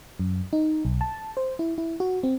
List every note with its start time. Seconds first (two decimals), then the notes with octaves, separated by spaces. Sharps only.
0.19 F#2
0.53 D#4
0.85 B1
1.01 A5
1.37 C5
1.59 E4
1.78 E4
2.00 F#4
2.23 C4